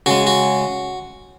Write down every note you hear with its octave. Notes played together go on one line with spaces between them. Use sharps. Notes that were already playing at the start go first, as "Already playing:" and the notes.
C#3 G#3 F#4
F#4